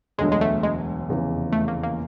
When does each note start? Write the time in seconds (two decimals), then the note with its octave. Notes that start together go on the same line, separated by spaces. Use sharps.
0.18 E1 D2 D3 F#3 G#3
0.32 G#3
0.41 A3
0.63 G#3
1.09 F1 E2 C#3 E3
1.52 A3
1.68 A#3
1.83 A#3